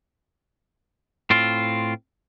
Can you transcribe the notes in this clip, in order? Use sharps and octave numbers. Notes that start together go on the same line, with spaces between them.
A2 C4 F4